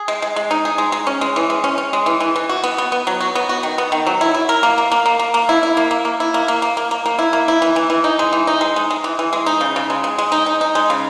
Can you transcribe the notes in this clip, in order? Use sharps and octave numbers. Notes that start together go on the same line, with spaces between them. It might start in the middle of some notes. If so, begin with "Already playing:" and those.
Already playing: G#4
G#3
G#3
G#3
D#4
G#4
G#3
G#3
C#4
G#3
E3
G#3
C#4
C#4
G#3
E3
E3
E3
F#4
B3
B3
B3
F#3
F#4
B3
F#4
D#3
B3
D#3
F#3
E4
E4
A#4
A#3
A#3
A#3
A#3
A#3
A#3
E4
E4
A#3
A#3
A#3
E4
A#3
A#3
A#3
A#3
A#3
A#3
E4
A#3
E4
E3
E3
E3
D#4
G#3
E3
D#4
G#3
G#3
G#3
E3
E3
G#3
D#4
C#3
C#3
G#3
G#3
G#3
D#4
D#4
D#4
G#3
C#3